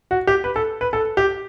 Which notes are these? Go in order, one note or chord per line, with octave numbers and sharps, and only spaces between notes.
F#4
G4
B4
A4
B4
A4
G4